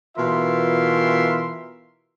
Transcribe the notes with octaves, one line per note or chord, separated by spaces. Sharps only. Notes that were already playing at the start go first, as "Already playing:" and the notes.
B2 E3 F4 A#4 E5 C6